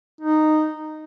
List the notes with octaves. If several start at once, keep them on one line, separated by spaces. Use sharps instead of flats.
D#4